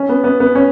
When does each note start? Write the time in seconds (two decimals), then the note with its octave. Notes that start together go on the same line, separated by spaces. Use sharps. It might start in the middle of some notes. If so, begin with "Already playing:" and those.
Already playing: C#4
0.09 B3
0.24 B3
0.40 B3
0.55 C#4